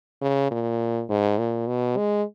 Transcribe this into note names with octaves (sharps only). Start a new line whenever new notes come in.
C#3
A#2
G#2
A#2
B2
G#3